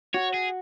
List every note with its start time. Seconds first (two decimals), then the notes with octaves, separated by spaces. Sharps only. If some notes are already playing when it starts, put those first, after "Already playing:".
0.14 F#4 C#5
0.34 G#4